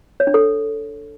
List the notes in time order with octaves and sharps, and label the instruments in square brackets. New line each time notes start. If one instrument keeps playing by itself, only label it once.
[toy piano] C#5
D4
A4